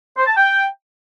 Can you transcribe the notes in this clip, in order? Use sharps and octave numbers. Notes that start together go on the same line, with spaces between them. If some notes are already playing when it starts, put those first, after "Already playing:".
C5
A5
G5